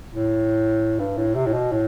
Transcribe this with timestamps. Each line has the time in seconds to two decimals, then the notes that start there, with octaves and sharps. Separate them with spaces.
0.08 A2
0.99 G2
1.17 A2
1.35 C3
1.46 A2
1.54 B2
1.72 A2